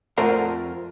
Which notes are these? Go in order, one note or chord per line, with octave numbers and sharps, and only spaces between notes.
F2 A3 A#4 C5 D5 F#5